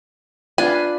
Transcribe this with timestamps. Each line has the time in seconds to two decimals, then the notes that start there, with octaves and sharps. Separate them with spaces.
0.58 D4 F4 B4 G#5